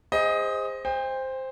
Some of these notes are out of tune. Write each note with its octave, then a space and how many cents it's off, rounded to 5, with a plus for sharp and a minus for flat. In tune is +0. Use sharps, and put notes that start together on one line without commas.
G#4 -30 C5 +0 D#5 +15
C5 +0 G5 +40